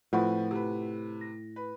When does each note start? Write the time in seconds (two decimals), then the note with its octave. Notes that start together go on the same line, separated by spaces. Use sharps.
0.13 A2 F3 C4 F4 B4 F#5 C#6
0.51 C3 B4
1.21 A#6
1.56 B4